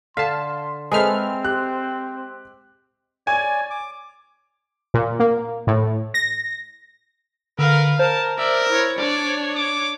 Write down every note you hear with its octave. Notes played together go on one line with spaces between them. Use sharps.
D3 F5 A5 C6 B6
G#3 C4 G#4 A4 B4 C5 E5 F6
G4 F#6
C#5 D5 G#5
D6
A#2
A#3
A2
A#6
D3 A#4 B4 F5
A#4 C5 A5
A#4 D5 E5
E4 C#5
D4 C#5 D5
D6